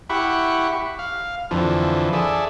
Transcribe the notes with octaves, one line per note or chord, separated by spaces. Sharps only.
E4 G4 F#5 B5 C#6
F5
F2 D3 E3 F3
G#4 A4 D5 E5